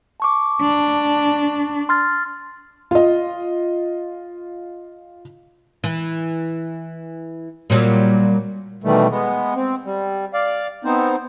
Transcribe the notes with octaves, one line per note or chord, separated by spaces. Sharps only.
A5 C#6 D6
D4
C6 F6 A6
F4 D#5
E3
A#2 F#3 G3
B2 D#3 E3 G3 A3
G#3 B3
C4
G3
D5 F5
B3 C4 D#4 C5